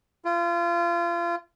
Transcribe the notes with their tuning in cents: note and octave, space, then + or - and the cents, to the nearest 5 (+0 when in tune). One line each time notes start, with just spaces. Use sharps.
F4 -30